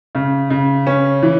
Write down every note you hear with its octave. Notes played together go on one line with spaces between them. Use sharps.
C#3
C#3
C#4
E3